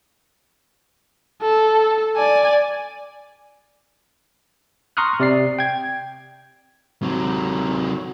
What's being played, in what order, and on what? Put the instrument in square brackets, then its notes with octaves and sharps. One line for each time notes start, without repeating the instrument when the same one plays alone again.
[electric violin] A4
D5 G#5
[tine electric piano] A#5 C6 C#6 D#6 F6 F#6
C3 D5 C7
G5 G#6
[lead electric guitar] C3 F#3